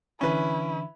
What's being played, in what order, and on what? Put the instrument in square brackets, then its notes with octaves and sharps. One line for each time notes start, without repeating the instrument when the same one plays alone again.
[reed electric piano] D3 E3 D4 [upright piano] C#4 B4 [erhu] E4